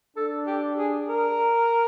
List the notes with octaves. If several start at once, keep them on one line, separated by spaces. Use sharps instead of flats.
D4 A4
G4
G#4
A#4